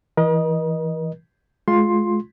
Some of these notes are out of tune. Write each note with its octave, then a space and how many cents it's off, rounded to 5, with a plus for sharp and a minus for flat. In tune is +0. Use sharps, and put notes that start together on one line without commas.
E3 +0 A#4 +45 D#5 +0
G#3 +30 F4 +10 C6 +10